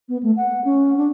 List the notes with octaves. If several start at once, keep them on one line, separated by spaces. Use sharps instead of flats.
B3
A3
F#5
C#4
D4